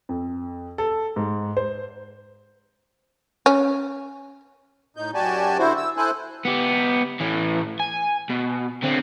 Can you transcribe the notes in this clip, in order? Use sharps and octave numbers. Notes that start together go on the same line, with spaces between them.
F2
A4
G#2
C5
C#4
A2 D#4 G6
F#2 F#4 G4 D5 G#5 A5
D3 E4 F#4 C5
E6
E4 A4 C5 G#5 F#6
B3 G4
A2 E3
G#5
B2
D3 C4